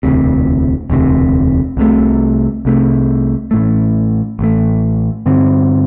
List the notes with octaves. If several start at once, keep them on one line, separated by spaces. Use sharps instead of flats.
E1 D2 C3
E1 D2 C3
C2 C3 A3
C2 C3 A3
A1 A2 A3
A1 A2 A3
G2 D3 C4